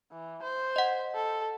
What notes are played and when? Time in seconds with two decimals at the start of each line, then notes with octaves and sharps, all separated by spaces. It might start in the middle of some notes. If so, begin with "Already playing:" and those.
0.12 E3
0.43 C5
0.76 D#5 F#5
1.15 A4